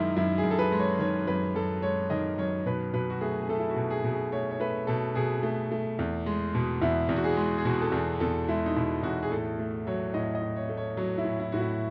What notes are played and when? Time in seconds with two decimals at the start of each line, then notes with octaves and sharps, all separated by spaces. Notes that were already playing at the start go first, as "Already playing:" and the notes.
Already playing: F#2 D#3 G#3 D#4 E4
0.16 F#2 E4
0.38 G#4
0.44 F#2
0.51 A4
0.59 B4
0.72 G#3
0.79 C#5
0.99 D#3 C#5
1.27 F#2 B4
1.55 F#2 A4
1.82 G#3 C#5
2.10 D#3 D#5
2.38 F#2 C#5
2.66 B2 B4
2.94 B2 B4
3.10 F#4
3.21 A3 G#4
3.43 G#4
3.49 A3 A4
3.60 E4
3.70 F#4
3.76 B2
3.90 G#4
4.04 B2
4.12 G#4
4.32 A3 C#5
4.51 C#5
4.60 A3 B4
4.87 B2 A4
5.15 B2 G#4
5.43 A3
5.72 A3
5.99 E2
6.26 G#3
6.55 B2
6.82 E2 E4
7.09 E2
7.16 F#4
7.24 G#4
7.37 G#3
7.58 G#4
7.65 B2 F#4
7.82 A4
7.92 E2 G#4
8.20 E2 A4
8.48 G#3 E4
8.66 D#4
8.76 B2 E4
9.03 E2 F#4
9.23 G#4
9.31 A2 A4
9.59 A3
9.87 F#3 C#5
10.14 A2 D#5
10.35 D#5
10.42 A2
10.56 C#5
10.69 A3
10.77 C#5
10.97 F#3 C#5
11.18 E4
11.25 A2
11.40 E4
11.52 A2 F#4
11.61 E4